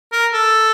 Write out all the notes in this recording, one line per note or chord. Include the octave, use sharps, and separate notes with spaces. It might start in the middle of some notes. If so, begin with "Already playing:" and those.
A#4
A4